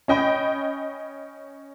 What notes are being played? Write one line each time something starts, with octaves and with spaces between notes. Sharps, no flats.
C#4 D#5 G5 B5